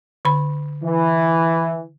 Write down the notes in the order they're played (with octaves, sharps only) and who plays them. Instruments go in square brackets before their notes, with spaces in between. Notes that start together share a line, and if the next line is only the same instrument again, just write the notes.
[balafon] D3 B5
[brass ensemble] E3